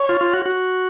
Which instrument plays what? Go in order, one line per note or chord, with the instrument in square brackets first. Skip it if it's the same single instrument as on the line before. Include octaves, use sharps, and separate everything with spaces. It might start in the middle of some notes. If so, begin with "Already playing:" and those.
Already playing: [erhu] C#5
[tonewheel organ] F4
F4
F#4
F#4